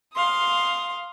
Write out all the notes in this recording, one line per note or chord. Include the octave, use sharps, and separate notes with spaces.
F5 C6 D#6